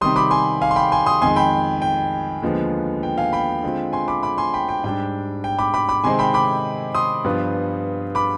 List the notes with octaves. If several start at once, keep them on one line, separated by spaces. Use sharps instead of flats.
C3 D#3 G3 C6 D#6
B5 D6
G#5 C6
F5 G#5
C6
G5 B5
G#5 C6
C6 D#6
F2 D#3 G#3 G#5 C6
G5 B5
G5
D#2 D3 F3 G#3 B3
G5
F5 G#5
G5 B5
D3 G#3 C4 F4
G#5 C6
B5 D6
B5 D6
G#5 C6
G5 B5
G5
G#2 G3 D4 G5
G5
B5 D6
B5 D6
B5 D6
C3 D#3 G#3 C4 D#4 G#5 C6
G5 B5
B5 D6
C6 D#6
G2 F3 B3 F4
B5 D6